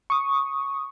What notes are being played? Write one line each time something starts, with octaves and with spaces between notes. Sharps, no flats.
C#6 D#6